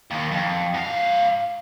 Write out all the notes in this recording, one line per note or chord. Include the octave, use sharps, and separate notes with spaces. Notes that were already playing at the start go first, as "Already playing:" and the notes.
D#2 D#3
F2
G#2 F5